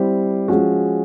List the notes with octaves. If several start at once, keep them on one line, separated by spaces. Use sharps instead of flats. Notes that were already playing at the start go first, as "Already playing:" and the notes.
Already playing: G3 C4 E4 G4 C5
F3 G#3 C#4 F#4